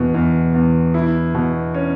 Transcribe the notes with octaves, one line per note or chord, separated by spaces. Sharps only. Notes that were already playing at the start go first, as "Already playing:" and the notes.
Already playing: E2 B2
E2
E2
E4
B2
C#4